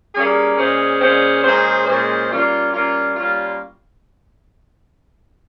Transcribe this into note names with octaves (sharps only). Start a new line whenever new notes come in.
G3 A#3 C#4 G#4
A#2 G#3 C#4 G#4 C5
A#2 G#3 C#4 G#4 C5
A#2 G#3 C#4 G#4 C5
A#2 G#3 C#4 G#4 C5
G3 A#3 C#4 F4
G3 A#3 C#4 F4
G3 A#3 C#4 F4